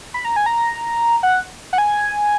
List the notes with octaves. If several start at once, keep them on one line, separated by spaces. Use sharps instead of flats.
B5
A#5
G#5
A#5
F#5
F#5
G#5